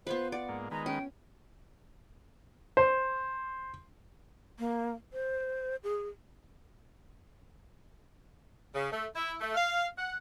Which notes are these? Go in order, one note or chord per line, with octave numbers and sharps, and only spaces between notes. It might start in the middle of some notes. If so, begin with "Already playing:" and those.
B3 F4 B4 C5
D5 F#5
G#2 A#3
D#3 G#3 B4 A#5
C#4 G5
C5
A#3
C5
G#4
C#3
A3
E4
A3
F5
F#5